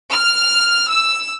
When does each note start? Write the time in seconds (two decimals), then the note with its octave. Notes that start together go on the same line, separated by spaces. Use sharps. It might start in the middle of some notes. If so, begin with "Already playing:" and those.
0.12 F6
0.89 E6